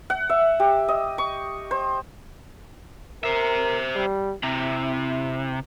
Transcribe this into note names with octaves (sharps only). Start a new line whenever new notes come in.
F#5
E5
G4
D#5
C#6
C5
A#4 C5 E5
G3
C3 E4